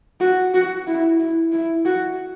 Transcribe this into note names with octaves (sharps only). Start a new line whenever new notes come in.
F#4
F#4
E4
E4
E4
F#4